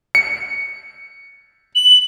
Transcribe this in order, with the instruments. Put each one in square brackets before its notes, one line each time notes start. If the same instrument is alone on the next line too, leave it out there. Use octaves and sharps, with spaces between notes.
[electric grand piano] C#7
[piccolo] F#7